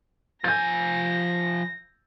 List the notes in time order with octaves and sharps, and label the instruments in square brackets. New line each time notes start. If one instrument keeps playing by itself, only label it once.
[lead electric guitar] F3 G#5 [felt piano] G6 A6 [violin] A#6